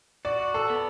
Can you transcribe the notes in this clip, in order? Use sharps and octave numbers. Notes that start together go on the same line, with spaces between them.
F#4 D5
A4
B3